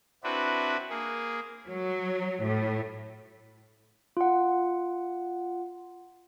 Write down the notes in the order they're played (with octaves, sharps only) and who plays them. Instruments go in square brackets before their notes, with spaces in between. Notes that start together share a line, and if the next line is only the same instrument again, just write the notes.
[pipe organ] C4 D4 E4 F#4 B4
A#3 G#4
[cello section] F#3
A2
[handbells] F4 F#5